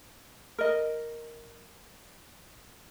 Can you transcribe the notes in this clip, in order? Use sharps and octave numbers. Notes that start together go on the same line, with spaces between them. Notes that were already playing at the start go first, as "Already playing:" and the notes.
A#4 D#5